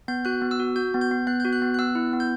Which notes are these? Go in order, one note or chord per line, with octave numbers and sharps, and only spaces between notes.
B3 G6
F#4 F#6
B3
E6
F#4
F#4 G6
B3
G6
B3
B3 F#6
F#4 G6
F#6
B3
F#6
B3 E6
E4
B3
G6